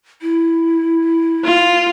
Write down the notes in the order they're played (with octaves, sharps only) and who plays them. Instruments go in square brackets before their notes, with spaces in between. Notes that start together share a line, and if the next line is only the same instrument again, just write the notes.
[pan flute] E4
[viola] F4